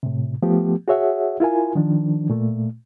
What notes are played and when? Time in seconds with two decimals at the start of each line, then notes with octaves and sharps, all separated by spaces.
0.03 A2 C3
0.42 F3 A3 B3 G4
0.88 F#4 G#4 C#5 E5 F#5
1.40 E4 F4 A#4 G#5
1.75 D#3 F3 D4
2.30 A#2 A3